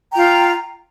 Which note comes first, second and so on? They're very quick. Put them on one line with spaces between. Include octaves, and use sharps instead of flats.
A#5 G5 F4